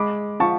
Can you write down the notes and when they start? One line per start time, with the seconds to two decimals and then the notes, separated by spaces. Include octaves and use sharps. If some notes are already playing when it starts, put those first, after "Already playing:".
Already playing: G#3 B5 D6
0.40 F3 A5 C#6